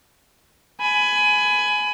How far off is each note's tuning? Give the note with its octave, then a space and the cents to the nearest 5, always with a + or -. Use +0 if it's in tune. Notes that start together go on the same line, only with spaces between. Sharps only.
G#5 +15 B5 +15